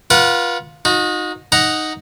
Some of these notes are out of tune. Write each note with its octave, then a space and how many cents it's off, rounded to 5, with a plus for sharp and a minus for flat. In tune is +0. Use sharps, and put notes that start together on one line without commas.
F4 +0 B4 -35 F#5 +0
D#4 +0 F#4 -40
D#4 +0 F#5 +0 A#5 +0